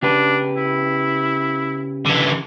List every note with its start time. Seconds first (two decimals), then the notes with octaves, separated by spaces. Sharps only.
0.03 C#3 D4 G4 B4
0.56 E4
2.06 D3 E3